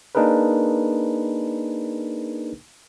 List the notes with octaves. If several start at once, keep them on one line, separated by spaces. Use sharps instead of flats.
A#3 D4 D#4 G#4 A#4 B4